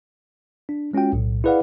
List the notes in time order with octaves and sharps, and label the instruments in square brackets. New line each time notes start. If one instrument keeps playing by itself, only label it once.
[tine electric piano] D4
G#3 C#4 F4 F#4 G5
B1 A2
E4 G#4 B4 D5 F5 F#5